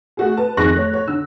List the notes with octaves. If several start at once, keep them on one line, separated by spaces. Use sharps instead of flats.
A3 F#4 G#4
B4 A5
F2 D#3 G#4 C#6 F#6 A#6
A3 C#5
C#5
D3 E6